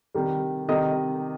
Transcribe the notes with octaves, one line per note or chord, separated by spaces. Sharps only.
C3 D#3 G3
C3 D#3 G3 D#5